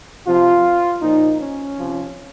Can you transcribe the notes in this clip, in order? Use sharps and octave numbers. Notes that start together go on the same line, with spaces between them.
C3 F3 F4
A#2 F3 D#4
C#4
C3 F3